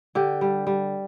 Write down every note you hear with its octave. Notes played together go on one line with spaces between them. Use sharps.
D3 G4
G3
G3